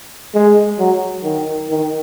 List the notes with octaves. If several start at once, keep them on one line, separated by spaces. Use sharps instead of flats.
G#3
F#3
D#3
D#3